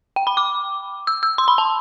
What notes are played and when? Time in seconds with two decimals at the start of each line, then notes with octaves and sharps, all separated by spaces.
0.16 G5
0.27 B5
0.37 D6
1.07 E6
1.23 E6
1.38 C6
1.48 B5
1.58 A5